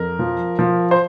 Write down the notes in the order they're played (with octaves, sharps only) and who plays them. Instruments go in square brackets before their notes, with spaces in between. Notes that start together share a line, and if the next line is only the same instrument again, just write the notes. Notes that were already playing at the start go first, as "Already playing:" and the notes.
Already playing: [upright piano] F2 A#4
F3
F3
C5